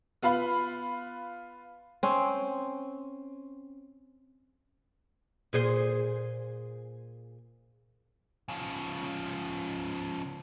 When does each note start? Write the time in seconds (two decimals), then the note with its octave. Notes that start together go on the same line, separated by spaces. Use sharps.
0.22 B3 F4 F5 B5
2.03 C4 C#4
5.53 A#2 G#4 C5
8.49 C#3 F3